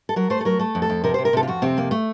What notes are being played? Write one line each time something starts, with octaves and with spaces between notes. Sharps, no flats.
A4
F#3 A#4
A3 C5
A4
F#3 A#4
A3 A4
F2
A4
F2
C3 A#4
C3 C5
A#4
C3 A4
F4
F2 F#4
C3 C4
F2 A#3
A3